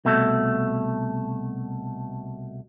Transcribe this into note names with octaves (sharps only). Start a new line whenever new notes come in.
C2 B2 A3